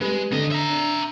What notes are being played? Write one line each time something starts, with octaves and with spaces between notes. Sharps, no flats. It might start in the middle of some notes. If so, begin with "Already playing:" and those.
G3 G#3 B4
D#2 D3 D#5
E5 A#5
D4